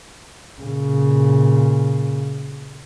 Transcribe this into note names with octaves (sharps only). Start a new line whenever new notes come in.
A#2 C#3